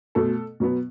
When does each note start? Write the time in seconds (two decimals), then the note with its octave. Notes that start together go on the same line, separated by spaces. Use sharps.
0.15 B2 A3 A4
0.60 B2 F#3 B3